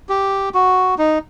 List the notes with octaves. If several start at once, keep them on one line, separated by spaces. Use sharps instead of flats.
G4
F#4
D#4